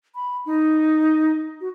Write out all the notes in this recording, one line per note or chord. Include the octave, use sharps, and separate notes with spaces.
B5
D#4
F#4